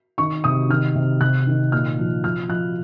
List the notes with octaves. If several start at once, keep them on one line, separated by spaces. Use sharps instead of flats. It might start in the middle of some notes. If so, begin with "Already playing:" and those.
D#3 C#6
C3 D#6
D#3 F6
C3
C3 F#6
D#3
A#2 F6
F3
F3 F6
F3 F#6